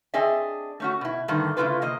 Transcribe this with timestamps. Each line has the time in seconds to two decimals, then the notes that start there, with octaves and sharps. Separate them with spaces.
0.14 C4 D4 G#4 D#5 E5
0.80 A3 C#4 F#4
1.01 B2 E4
1.28 G2 D3 D#3 A3
1.57 C#3 A3 A#3 E4 F4 B4
1.82 C3 A#3 D#5